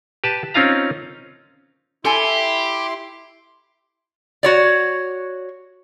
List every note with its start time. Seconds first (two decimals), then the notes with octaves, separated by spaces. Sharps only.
0.24 G4 B4 A5
0.54 C4 C#4 D#4 F4 F5 A#5
2.05 E4 G4 A4 G#5 C6
4.43 F#4 C#5 D5